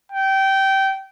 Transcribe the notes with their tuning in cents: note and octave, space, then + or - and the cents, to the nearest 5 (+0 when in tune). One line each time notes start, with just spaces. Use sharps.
G5 -20